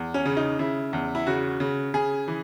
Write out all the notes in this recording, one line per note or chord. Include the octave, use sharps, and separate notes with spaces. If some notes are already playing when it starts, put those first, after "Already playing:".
Already playing: E2
C#4
C#3
D#4
C#3 E4
E2
E4
C#3 F#4
C#3
C#3 G#4
E3